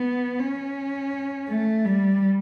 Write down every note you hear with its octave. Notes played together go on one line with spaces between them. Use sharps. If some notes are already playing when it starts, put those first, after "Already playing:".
Already playing: B3
C#4
A3
G3